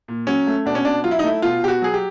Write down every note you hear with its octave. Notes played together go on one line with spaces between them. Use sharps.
A#2
F#3 C#4
A3
B2 D4
C#4
B2 D4
F#3 F4
E4
D#4
A3 E4
B2 F4
B2 G4
F#4
F#3 G#4
G4